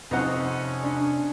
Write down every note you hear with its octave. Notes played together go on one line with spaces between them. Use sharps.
F2 C3 C#4 D#4 C5 F#5
D4